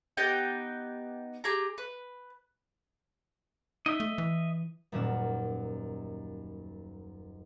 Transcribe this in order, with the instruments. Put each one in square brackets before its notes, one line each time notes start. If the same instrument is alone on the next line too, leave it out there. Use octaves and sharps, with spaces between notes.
[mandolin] B3 D#4 G4 G5
G4 G#4 A#5
B4
[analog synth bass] D#4 [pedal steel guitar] D#5 E5
[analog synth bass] A3
E3
[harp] D#1 F#2 A#2 C#4 F#5 E7